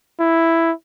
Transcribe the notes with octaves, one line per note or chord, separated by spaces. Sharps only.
E4